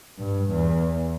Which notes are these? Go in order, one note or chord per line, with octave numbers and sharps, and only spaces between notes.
G2
E2